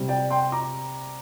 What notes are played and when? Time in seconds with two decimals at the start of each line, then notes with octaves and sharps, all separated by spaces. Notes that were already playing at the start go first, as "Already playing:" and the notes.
Already playing: C3 G3
0.08 D5 G5
0.30 G5 C6
0.52 A#5 D6